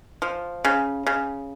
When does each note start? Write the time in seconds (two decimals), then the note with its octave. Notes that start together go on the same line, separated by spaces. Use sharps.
0.22 F3
0.65 C#3
1.07 C#3